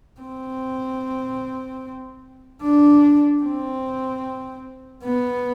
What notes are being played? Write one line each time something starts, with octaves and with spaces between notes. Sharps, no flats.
C4
D4
C4
B3